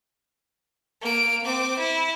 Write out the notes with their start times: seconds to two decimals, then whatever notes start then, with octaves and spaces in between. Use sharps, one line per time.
1.01 A#3 D7
1.44 C4 D6
1.79 E4